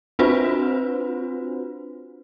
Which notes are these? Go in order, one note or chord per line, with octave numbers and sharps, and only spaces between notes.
C4 D4 F4 F#4 B4 C5